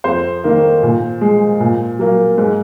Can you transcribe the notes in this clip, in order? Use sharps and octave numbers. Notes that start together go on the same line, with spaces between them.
F2 C5
D#3 A#3
A#2
G#3
A#2
F#3 A#3
G#2